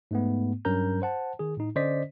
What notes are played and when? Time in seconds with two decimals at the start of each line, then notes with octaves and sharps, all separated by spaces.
0.11 G#2 A3 B3
0.65 G2 F#3 C#4 A#4 A#5 G6
1.02 C5 F#5 A5
1.39 D#3 G#4
1.57 A2 D#4
1.76 D3 C#4 C5 D5 D#5 B6